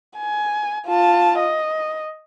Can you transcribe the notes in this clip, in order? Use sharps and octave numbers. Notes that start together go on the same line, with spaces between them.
G#5
F4 A5
D#5